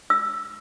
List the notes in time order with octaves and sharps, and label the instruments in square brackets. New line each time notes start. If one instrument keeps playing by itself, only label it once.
[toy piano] E6